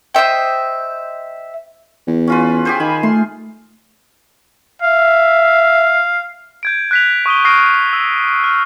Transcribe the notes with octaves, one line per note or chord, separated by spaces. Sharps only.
C5 D#5 E5 G5
E2
C#4 F4 B4
G4 G#4 C5
D#3 G#5 B5
A3 C6
E5 F5
G6 G#6 D7
F#6 B6 F7
C#6 D#6 D#7 G7
C#6 D#6 F6 A#6 C7 D7
E6
F6